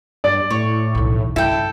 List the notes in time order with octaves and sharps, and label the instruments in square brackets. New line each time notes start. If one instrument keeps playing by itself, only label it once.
[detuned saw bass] G2 [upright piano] D5
[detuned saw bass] A2 [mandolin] C#5
[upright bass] B1 E2
[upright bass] G2 C#3 [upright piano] E4 [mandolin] A4 G5